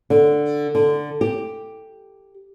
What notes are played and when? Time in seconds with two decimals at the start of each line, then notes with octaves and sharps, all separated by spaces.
0.10 D3
0.75 D3
1.21 G4